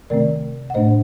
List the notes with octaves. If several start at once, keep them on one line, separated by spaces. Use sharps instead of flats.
C3 D#3 A3 C4 A#4 D5
F#5
A2 A3 D4 C5 D#5